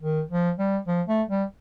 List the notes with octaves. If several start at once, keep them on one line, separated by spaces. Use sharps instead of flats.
D#3
F3
G3
F3
A3
G3